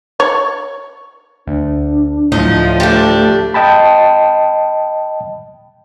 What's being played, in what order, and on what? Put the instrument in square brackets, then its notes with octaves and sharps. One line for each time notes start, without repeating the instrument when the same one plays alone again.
[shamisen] C#5
[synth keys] D2 [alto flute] D4
[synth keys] D2 A2 [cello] F3 [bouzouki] D#4
[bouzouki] G3 D4 [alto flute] A3
[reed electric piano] D#5 G5 A5 B5